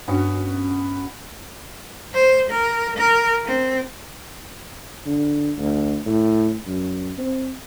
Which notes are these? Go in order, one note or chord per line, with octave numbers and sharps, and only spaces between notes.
G2 B3 C#4 D4 F#4
C5
A#4
A#4
C4
D3
D2
A2
F#2
C4